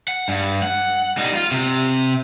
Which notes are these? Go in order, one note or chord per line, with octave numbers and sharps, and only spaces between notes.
F#5
G2
F#5
G3 D#4
F4
C3